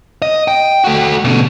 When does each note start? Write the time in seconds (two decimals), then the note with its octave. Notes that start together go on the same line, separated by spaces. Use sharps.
0.22 D#5
0.48 G5
0.84 A3 F#4
1.24 B2 D3